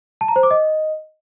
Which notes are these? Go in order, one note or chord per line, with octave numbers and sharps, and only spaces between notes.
A5
A#5
C5
D6
D#5